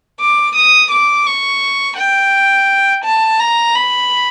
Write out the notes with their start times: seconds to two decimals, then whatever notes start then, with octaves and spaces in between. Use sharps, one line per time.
0.21 D6
0.56 D#6
0.91 D6
1.27 C#6
1.97 G5
3.04 A5
3.40 A#5
3.75 B5